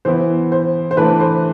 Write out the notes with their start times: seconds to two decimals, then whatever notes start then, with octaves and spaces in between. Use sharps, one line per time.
0.05 E3 B3 E4 C5
0.52 C5
0.91 C5
0.97 E3 A3 D4 B4
1.20 C5